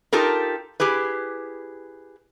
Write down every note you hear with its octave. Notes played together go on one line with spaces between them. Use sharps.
D#4 F4 G4 A4 A#4
E4 G4 G#4 B4